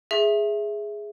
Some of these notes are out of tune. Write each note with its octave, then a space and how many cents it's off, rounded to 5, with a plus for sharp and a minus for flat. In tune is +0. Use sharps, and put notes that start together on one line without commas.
G#4 +0 E5 +0 C6 +40